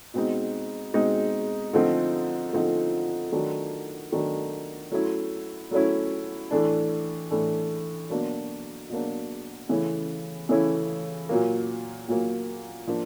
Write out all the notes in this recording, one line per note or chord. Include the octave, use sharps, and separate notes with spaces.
B2 G#3 C4 D#4
B2 G#3 C4 D#4
D3 F3 A3 C4 D#4
D3 F3 A3 C4 D#4
D#3 F#3 A3 D4
D#3 F#3 A3 D4
F#3 A3 C#4 E4
F#3 A3 C#4 E4
A2 E3 A3 D4
A2 E3 A3 D4
B2 F#3 A#3 D4
B2 F#3 A#3 D4
C#3 E3 A3 C#4 E4
C#3 E3 A3 C#4 E4
A#2 F#3 A#3
A#2 F#3 A#3
F3 A#3 D4